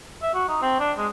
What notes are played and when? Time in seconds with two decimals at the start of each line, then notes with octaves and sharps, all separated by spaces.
0.22 E5
0.34 F#4
0.48 D#4
0.62 C4
0.79 D4
0.98 G#3